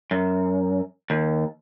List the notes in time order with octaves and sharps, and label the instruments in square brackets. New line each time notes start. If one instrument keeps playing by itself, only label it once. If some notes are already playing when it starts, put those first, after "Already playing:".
[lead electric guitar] F#2
D#2